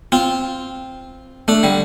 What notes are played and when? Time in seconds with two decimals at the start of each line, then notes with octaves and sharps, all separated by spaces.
0.12 C4 F4
1.48 A3 D4
1.63 D3 G3